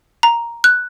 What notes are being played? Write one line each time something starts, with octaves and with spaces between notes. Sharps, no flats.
A#5
F#6